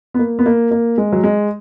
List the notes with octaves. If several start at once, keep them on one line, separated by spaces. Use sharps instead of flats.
B3
A#3
B3
A#3
A#3
G#3
F#3
G#3